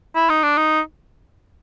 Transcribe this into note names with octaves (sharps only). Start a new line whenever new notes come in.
E4
D#4
D4
D#4